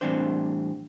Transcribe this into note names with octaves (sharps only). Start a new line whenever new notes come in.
A2 E3 G3 C4 D4 C5